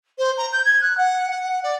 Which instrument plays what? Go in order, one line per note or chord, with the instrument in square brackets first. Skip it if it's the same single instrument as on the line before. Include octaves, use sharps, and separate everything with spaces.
[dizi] C5
A#5
G6
G#6
F#6
F#5
F#5
D5